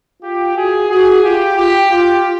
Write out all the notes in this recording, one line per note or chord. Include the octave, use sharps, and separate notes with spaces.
F4 G4
F#4 G#4
F#4 G#4
F4 G4
F4 G4
F4 G4